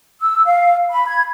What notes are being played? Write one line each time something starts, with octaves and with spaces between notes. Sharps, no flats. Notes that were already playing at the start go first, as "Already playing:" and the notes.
E6
F5
B5
G#6